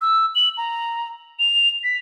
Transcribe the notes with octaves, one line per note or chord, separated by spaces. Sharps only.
E6
F#7
A#5
F7
B6